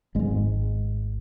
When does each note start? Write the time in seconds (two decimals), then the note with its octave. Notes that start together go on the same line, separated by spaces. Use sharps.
0.15 G#1 G#2 G#3